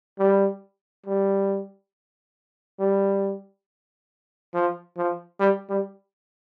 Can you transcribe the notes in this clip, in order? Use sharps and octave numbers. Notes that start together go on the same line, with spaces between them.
G3
G3
G3
F3
F3
G3
G3